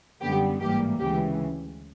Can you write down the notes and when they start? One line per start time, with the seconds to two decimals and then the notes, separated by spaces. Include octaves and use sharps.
0.21 F#2 D3 G3 B3 G4
0.61 A1 G#2 E3 G3 A#3 G4
0.99 D2 C#3 E3 G#3 G4